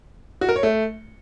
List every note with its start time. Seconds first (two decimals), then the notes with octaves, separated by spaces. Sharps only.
0.41 F#4
0.49 A#4
0.56 C#5
0.63 A3